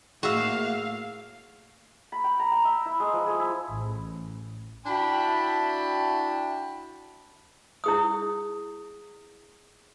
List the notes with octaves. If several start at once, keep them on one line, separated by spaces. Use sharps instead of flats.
A2 A#3 F#4 G#4 E5 F5
B5
G5
A#5
G5
E5
E4
G#3
F3
G#4
E4
A1
D4 E4 F#4 G5 A5 B5
E4 G#4 D#6